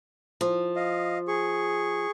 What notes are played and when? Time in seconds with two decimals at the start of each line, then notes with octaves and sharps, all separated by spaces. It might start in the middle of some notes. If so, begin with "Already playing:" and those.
0.41 F3
0.76 D#5 F5
1.28 G#4 C#6